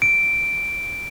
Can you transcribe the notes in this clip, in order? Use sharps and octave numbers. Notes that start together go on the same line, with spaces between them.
D7